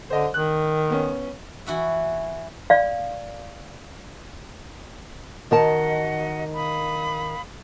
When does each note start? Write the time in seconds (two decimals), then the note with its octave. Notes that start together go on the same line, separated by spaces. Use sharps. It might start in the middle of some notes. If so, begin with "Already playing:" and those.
0.10 D3 C5 D#5
0.34 D#3 F#6
0.90 B3 C#4
1.67 E3 F#4 E5
2.70 D5 F5
5.51 D#3 F#4 A#4 D#5 F#5 A5
6.55 F5 B5 D#6